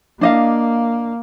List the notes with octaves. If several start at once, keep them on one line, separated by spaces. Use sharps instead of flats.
A#3 D4 D#5 F5